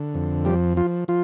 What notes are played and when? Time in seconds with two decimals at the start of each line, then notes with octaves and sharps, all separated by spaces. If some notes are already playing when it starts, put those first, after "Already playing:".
Already playing: D3
0.14 F2
0.45 F3 G3 G4
0.77 F3 F4
1.08 F3 F4